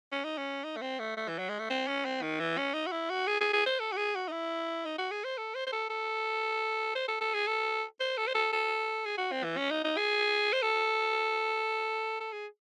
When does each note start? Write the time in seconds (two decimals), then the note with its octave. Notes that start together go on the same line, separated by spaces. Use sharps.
0.12 C#4
0.24 D#4
0.38 C#4
0.64 D#4
0.76 A3
0.82 C4
0.99 A3
1.17 A3
1.28 E3
1.39 F#3
1.49 G#3
1.59 A3
1.70 C4
1.88 C#4
2.05 C4
2.22 D#3
2.40 E3
2.58 C#4
2.74 D#4
2.86 F#4
2.92 E4
3.10 F#4
3.27 G#4
3.41 G#4
3.53 G#4
3.66 C5
3.80 A4
3.92 F#4
3.97 G#4
4.15 F#4
4.28 D#4
4.32 E4
4.85 D#4
4.98 F#4
5.11 G#4
5.24 C5
5.38 A4
5.55 C5
5.67 C5
5.72 A4
5.90 A4
6.95 C5
7.08 A4
7.21 A4
7.34 G#4
7.48 A4
8.00 C5
8.17 A4
8.27 C5
8.35 A4
8.52 A4
9.06 G#4
9.18 F#4
9.32 C4
9.44 E3
9.57 C#4
9.71 D#4
9.84 D#4
9.97 G#4
10.53 C5
10.62 A4
12.20 A4
12.33 G#4